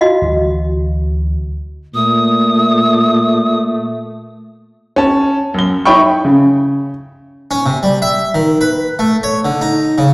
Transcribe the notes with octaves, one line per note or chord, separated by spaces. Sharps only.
F#4 D#5 F5
D2 E3 F#3
A#2 A3 D#6
C#4 A5
F#2 G7
D#4 E4 C#5 G5 B5 C#6
C#3
C#4
C3
G3
E5
D#3
B4
A3
C#5
D3
D#4
C#3